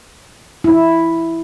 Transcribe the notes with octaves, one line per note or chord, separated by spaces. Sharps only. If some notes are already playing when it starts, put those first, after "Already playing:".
E4